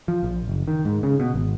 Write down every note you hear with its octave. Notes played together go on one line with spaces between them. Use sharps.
F3
A#1
F#1
D#3
G#2
C#3
B2
G#1